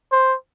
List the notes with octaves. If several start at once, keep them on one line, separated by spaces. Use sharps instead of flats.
C5